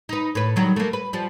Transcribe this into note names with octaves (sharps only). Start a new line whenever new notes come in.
D#4 B4
A2 B4
D#3 F#3 G3
A3 A#3
B4
F3 G3